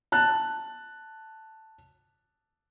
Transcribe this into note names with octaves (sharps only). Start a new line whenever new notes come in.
A5 F#6